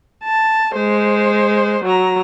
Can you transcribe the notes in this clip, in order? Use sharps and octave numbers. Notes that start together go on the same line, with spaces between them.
A5
G#3 C5
F#3 A#5